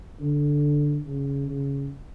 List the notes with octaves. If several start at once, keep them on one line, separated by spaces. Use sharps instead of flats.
D3
C#3
C#3